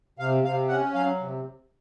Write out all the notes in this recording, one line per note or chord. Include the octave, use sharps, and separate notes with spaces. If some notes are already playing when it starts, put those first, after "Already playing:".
C3 F5
C3 F5
C#4 F#5
F#3 F5
C3